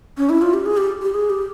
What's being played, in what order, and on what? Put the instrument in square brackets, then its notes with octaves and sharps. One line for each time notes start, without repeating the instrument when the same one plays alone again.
[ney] C#4
E4
F4
G4
G#4
G4
G4
G#4
G4